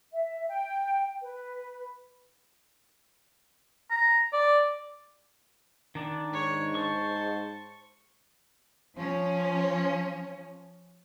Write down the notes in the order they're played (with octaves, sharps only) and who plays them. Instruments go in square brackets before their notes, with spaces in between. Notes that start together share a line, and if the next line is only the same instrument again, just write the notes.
[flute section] E5
G5
B4
[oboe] A#5
D5
[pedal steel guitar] D#3 D4
[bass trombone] G#2 [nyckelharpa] C#5
[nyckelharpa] C5 A5 [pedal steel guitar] C#6
[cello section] F3 C#4